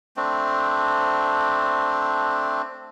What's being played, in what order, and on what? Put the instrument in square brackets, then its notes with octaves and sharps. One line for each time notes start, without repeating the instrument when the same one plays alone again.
[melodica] A3 C4 D4